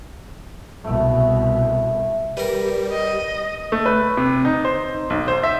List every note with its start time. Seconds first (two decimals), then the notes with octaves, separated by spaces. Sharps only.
0.84 C2 B2 A3 E5
2.37 G3 A#4 B4
2.92 D#5
3.72 A3
3.86 B4
4.17 C3
4.45 D#4
4.65 C5
5.10 B1
5.28 C5
5.43 E5